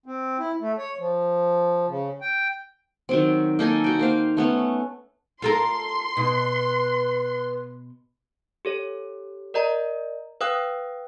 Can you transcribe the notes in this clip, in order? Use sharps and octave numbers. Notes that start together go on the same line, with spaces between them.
C4
E4
A3
C#5
F3
C#3
G5
D#3 F#3 C4
A#3 D#4 A4 G#5
F#4 G5
A#3 C5 F5
A3 B3 C#4
F4 A4 A#4 C6
B2 B4
G4 A4 C#5
A#4 D5 D#5 A#5
B4 F5 G5 D#6 F#6